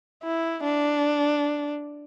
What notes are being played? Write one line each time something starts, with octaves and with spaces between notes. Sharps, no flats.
E4
D4